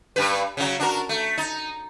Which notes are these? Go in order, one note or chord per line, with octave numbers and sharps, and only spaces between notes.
G2 B4
C#3 F#3
D4 F#4 A#4
A3
D#4